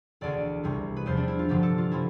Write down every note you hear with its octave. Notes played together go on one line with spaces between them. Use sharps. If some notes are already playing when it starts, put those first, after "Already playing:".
E1 D2 D3 D5
C2 C3 G3
B4
E2 C3 F3 C5
D4
E4
F4
G1 G2 D3 F3 G4
A4
F4
C3 F3 E4